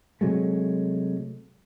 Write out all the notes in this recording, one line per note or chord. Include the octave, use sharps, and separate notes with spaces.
C3 F#3 G#3 A3